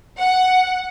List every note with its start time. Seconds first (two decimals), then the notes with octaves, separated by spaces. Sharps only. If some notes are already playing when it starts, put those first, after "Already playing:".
0.18 F#5